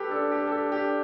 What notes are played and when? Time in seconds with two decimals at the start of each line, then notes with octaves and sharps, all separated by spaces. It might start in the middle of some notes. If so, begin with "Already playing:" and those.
Already playing: G4 A4 B4
0.11 D4 A4
0.31 G4
0.47 A4
0.52 G4
0.72 G4